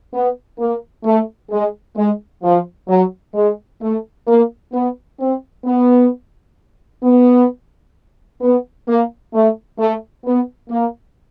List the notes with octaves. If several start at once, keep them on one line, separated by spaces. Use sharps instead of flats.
B3
A#3
A3
G#3
G#3
F3
F#3
G#3
A3
A#3
B3
C4
B3
B3
B3
A#3
A3
A3
B3
A#3